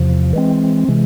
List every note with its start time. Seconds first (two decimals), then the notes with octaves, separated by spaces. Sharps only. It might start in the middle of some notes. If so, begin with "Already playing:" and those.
Already playing: E2 C3 F3
0.33 E3 G#3 C4
0.88 C3 E3 G#3